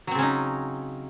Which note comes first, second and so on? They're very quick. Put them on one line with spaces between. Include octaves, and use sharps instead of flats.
F#3 C4 C#3 C#4 D#4